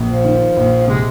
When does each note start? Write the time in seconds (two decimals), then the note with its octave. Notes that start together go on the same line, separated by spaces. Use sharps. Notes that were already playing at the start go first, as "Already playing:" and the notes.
Already playing: A#1
0.09 F3
0.25 D#3
0.57 A#1
0.88 C3 G#3